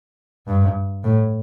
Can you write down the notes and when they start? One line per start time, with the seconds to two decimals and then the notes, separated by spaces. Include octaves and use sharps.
0.47 G2
1.04 A2